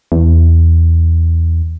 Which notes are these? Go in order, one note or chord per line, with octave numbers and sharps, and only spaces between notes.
E2